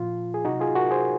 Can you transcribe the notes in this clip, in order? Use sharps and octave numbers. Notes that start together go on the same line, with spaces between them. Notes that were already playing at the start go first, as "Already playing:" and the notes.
Already playing: A#2 F3 F4
G#4
C3 F#3 D#4 F#4
F4 G#4
F#4 A#4
G#4 C5